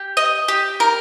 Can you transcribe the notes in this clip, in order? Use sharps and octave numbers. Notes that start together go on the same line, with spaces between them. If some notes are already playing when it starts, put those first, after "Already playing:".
Already playing: G4
D#5
G4
A#4